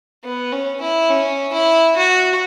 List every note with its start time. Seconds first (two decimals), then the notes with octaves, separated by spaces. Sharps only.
0.24 B3
0.52 C#4
0.81 E4
1.10 C#4
1.53 E4
1.96 F#4